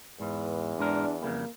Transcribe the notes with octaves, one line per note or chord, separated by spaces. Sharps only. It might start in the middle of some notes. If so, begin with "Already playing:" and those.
E2 G#2 B4
G#2 G#3 D4 A#4
F2 C#3 G3 A#3